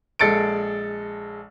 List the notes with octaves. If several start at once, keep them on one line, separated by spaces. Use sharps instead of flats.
A#1 G#3 A4 A6 C#7 D7